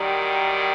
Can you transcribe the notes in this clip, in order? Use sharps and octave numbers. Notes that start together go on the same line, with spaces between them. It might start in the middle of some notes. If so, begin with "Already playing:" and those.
Already playing: F#2 D#3 G3